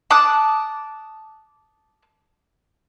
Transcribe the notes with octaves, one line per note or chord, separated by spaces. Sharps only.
A5 D6 D#6 F#6